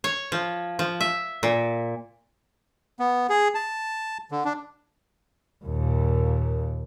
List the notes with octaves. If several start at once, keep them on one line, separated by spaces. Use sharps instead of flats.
C#5
F3
F3
E5
A#2
B3
G#4
A5
D3
D4
D#2 A#2